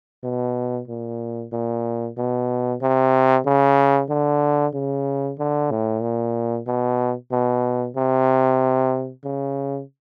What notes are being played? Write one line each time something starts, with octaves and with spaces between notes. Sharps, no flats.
B2
A#2
A#2
B2
C3
C#3
D3
C#3
D3
A2
A#2
B2
B2
C3
C#3